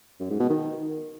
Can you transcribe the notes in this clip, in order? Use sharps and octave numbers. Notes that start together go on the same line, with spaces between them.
F#2
G#2
B2
D#3